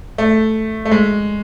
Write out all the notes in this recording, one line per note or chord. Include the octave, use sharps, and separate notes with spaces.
A3
A3
G#3